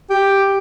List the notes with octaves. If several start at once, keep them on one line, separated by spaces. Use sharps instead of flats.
G4